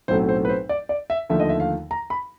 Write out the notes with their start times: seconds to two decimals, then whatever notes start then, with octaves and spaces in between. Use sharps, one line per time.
0.08 B1 A2 F#3 A3 C4 C5
0.29 C5
0.45 B4
0.49 C5
0.69 D5
0.89 D5
1.10 E5
1.30 D#2 D3 F3 A3 E5
1.40 D#5
1.49 E5
1.60 F5
1.91 A#5
2.10 B5